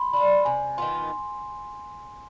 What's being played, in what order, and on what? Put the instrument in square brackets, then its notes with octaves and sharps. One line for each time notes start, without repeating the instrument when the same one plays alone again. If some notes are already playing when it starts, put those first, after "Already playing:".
Already playing: [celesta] B5 C6
[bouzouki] D4 F4 [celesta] B5
[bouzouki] C3 [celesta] G#5
[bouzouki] D#3 B3 F4 [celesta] C6